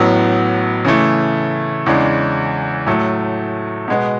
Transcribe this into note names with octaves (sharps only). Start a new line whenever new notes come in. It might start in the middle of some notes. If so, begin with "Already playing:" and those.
Already playing: A1 A2 F#3 B3
C#3 E3 A3
E2 C#3 G#3 D4
A2 F#3 A3
B2 G#3 B3